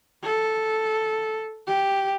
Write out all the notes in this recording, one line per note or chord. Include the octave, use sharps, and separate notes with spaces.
A4
G4